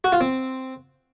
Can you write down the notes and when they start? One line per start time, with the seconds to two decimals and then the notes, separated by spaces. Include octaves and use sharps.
0.04 F#4
0.12 F4
0.21 C4